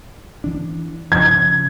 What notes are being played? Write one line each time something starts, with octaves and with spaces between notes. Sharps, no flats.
E3 D4
C#3 F3 G#6